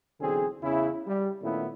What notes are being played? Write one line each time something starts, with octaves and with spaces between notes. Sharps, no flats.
B1 D3 E3 C4 G#4
E2 C#3 E4
G3
A#2 D#3 A3 B3 C#4 E4